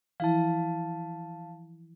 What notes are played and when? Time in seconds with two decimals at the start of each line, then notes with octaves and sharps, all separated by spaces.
0.20 E3 F3 E4 F5 A5